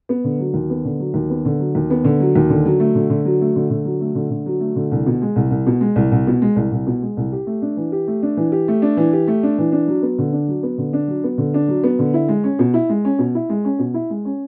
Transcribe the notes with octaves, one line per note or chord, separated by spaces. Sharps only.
B3
D3
F#3
D#2
B3
D3
F#3
D#2
B3
D3
F#3
D#2
B3
D3
F#3
D#2
D3
F#3
A3
D3
D3
F#3
A3
D3
D3
F#3
A3
D3
D3
F#3
A3
D3
C2
B2
G#3
C2
C2
B2
G#3
C2
C2
B2
G#3
C2
C2
B2
G#3
C2
G4
A3
D4
E3
G4
A3
D4
E3
G4
A3
D4
E3
G4
A3
D4
E3
D4
F#3
B3
D3
D4
F#3
B3
D3
D4
F#3
B3
D3
D4
F#3
B3
D3
E4
G#3
C#4
B2
E4
G#3
C#4
B2
E4
G#3
C#4
B2
E4
G#3
C#4